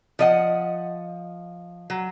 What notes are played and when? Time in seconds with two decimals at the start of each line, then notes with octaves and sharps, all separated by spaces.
0.19 F3 D#5 F#5
1.90 F#3